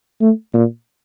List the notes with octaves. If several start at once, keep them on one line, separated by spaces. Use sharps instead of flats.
A3
A#2